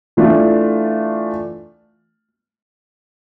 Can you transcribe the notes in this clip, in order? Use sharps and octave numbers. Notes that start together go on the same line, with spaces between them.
E3 A3 D4 F4